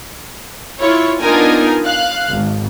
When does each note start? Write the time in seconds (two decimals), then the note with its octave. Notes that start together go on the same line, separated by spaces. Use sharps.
0.82 E4 F4 C#5
1.21 B3 D4 D#4 F4 A#4 G#5
1.86 F5 F#6
2.30 G#1